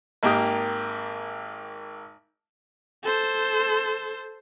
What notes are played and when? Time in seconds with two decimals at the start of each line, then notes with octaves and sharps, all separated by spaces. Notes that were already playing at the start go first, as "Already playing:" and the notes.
0.23 G#1 A#3 G4 G5 D#6
3.04 A4 C5